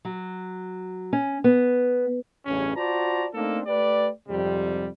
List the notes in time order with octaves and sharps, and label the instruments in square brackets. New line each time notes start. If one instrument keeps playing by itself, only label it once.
[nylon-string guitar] F#3
C#4
B3
[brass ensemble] A1 E2 G2 C#3 C#4
F4 F#4 C5 D5 A5 A#5
A3 A#3 C4 D4 D#4 A4
A3 G4 B4 D5
F2 G#2 C3 G3